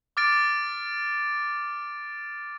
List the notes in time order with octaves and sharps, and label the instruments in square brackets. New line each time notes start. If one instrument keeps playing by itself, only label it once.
[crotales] D6 F6 A6 D7